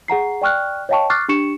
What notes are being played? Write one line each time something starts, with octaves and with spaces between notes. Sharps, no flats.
G#4 F#5 A#5 C7
D5 G5 C#6 F6 F#6
C#5 D#5 F5 G5 A5 C#6
C#6 D6 F6 F#6 A6 C7
D4 G4 C#6 C#7 E7